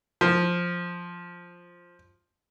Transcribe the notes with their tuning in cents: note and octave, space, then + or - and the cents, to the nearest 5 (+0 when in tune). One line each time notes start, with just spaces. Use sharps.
F3 +5